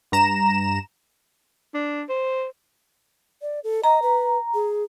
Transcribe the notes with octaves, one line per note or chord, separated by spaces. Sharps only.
G2 A#5 E7
D4
C5
D5
A4
D#5 A#5
B4
G#4